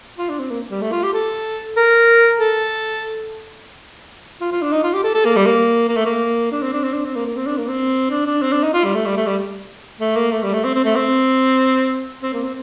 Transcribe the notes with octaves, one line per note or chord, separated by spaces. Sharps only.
F4
D4
C4
A#3
G3
A3
F4
G4
A4
A#4
A4
F4
F4
D4
D#4
F4
G4
A4
A4
A#3
G3
A#3
A#3
A3
A#3
D4
C4
D4
C4
D4
C4
A#3
A#3
C4
D4
A#3
C4
D4
D4
C4
D4
D#4
F4
G3
A3
G3
A3
G3
A3
A#3
A3
G3
A3
C4
C4
A3
C4
C4
A#3
C4